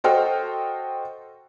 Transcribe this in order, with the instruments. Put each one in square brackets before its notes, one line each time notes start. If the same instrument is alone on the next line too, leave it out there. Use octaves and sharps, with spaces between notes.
[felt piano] F#4 A4 C5 D#5 G5 F6